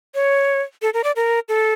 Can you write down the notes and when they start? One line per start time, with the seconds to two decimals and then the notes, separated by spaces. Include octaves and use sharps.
0.15 C#5
0.82 A4
0.94 A#4
1.04 D5
1.16 A#4
1.49 A4